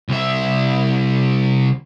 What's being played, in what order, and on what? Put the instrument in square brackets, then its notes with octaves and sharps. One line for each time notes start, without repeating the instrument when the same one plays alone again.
[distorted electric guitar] C2 E5